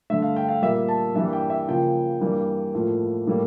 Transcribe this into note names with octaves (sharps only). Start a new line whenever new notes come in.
G2 D3 A3 E5
F5
G5
F5
A#2 G3 A#3 E5
A5
G2 E3 G3 A#3 E5
G5
E5
C#3 F3 A#3 G5
G2 E3 G3 A#3
A2 F3 A#3
A2 G3 A#3